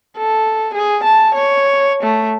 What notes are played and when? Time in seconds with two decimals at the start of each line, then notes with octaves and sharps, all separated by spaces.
0.17 A4
0.74 G#4
1.04 A5
1.35 C#5
2.03 A3